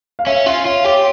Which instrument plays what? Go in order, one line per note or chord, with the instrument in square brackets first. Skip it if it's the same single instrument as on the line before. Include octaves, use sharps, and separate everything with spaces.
[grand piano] F5
[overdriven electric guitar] C#4 [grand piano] E5
[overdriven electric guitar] F4 [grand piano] E5
[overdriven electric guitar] F4 [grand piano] C#5
[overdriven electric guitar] G4 [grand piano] C#5